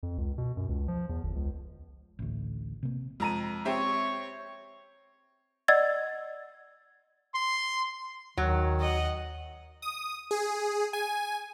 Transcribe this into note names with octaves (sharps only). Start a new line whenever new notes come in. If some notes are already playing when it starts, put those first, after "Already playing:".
F2
C#2
B2
F#2
C#2
F3
E2
G1
C#2
A1 D2
C3 A#3
F2 G#3 A#5 D#7
C4 G4 C#5 E5 C#6
D5 D#5 F#5 E6 G#6 A6
C6
D#2 D#3 F#3
D#5 F#5
D#6
G#4
G#5